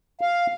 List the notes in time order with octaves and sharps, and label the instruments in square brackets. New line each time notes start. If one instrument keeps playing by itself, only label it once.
[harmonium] F5